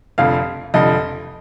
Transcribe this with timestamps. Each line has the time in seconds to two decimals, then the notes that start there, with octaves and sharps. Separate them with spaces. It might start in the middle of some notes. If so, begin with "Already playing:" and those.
0.18 F1 F2 D3 F5
0.74 F1 F2 D3 D#5